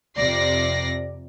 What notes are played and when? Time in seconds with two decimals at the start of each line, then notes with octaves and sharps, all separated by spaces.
0.16 F2 C3 D5 A#6 C7